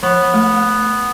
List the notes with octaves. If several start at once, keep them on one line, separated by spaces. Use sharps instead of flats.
F3 B3
A3